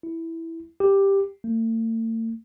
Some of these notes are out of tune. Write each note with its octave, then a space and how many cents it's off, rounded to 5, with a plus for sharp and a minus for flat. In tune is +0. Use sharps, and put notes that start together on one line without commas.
E4 -5
G4 +5
A3 +45